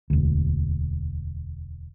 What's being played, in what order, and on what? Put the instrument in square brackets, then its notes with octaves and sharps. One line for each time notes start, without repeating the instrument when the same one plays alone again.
[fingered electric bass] E1 D2